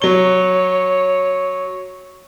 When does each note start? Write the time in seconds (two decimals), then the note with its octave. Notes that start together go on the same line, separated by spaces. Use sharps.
0.02 F#3 C#5 G7